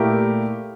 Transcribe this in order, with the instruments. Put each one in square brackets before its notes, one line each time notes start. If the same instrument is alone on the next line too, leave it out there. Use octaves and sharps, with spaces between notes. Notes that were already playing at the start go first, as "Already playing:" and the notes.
Already playing: [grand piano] A#2 A3 E4 G4 A#4